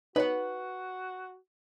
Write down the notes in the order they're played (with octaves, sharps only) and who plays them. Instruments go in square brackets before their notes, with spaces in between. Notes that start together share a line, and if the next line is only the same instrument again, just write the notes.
[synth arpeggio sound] D#4 C#5 [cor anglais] F#4 [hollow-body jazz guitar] B4 F#5